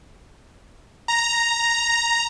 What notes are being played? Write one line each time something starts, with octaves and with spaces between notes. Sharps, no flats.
A#5